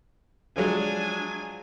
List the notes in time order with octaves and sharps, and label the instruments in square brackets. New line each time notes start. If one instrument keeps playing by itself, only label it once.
[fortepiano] F3 F#3 G#3 [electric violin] D4 G#5